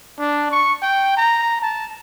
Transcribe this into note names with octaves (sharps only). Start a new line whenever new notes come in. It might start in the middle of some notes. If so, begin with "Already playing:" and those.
D4
C#6
G5
A#5
A5